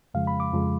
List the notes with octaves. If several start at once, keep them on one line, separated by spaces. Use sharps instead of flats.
F2 C#3 F3 G#3 F5
B5
D6
F2 C#3 F3 G#3